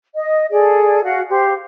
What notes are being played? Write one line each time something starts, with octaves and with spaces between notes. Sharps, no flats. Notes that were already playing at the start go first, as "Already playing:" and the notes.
D#5
G#4 A4 D5
F#4 F5 F#5
G4 C5 F5 C6